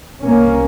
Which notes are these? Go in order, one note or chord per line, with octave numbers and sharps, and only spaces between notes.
C2 C3 A#3 C#4